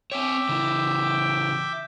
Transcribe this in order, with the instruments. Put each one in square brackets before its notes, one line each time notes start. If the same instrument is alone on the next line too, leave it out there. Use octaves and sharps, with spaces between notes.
[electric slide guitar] C4 C#5 [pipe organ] E5 G5 D6
[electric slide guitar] C#3 E3